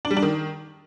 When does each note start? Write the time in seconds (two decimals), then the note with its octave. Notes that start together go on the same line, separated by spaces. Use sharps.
0.05 D4
0.11 G3
0.17 D4
0.22 D#3